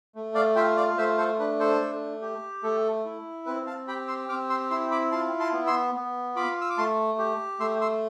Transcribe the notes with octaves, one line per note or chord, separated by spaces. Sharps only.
A3
D5 F5
F4 E5 G5
D5 F5
A3 C5 E5
A4 C5
D4 B4
A4 C5
A3
G4
A3 A4
E4
C4 B4
F5 A5
G4 G5 B5
C6 E6
C4 D6 F6
C6 E6
E4 C6 E6
B5 D6
F4 A5 C6
A5 C6
B3
C6 E6
B3
F4 B5 D6
E6
D6
A3 A5 C6
G4
A3 C6 E6
C6 E6